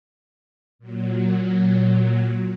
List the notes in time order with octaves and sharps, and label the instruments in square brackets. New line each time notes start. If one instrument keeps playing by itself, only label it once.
[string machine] A#2 F#3